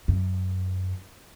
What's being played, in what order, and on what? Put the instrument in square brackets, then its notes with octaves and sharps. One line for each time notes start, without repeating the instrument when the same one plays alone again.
[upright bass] F#2